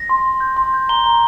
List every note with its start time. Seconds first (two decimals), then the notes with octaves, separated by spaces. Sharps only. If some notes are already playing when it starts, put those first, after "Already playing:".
Already playing: A#6
0.09 C6
0.26 C6
0.40 G6
0.57 C6
0.74 G6
0.89 A#5 G7
1.06 A#5